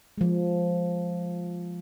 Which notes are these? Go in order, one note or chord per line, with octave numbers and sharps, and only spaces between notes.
F3 G#3